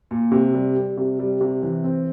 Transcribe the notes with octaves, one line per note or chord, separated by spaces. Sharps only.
A#2
C3
G3
G3
C3
G3
C3
E3
C4